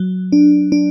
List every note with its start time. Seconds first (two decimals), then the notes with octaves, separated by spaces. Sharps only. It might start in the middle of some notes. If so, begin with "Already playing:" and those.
Already playing: F#3
0.32 D4
0.72 D4